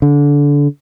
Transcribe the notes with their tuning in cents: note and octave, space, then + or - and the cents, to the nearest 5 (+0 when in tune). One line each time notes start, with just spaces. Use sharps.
D3 -25